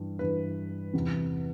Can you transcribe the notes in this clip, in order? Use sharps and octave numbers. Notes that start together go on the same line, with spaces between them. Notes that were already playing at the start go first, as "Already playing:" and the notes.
Already playing: G2 E3
G2 E3 B4
E2 C3 E3